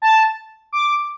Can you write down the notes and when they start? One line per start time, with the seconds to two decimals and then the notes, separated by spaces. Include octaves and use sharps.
0.02 A5
0.73 D6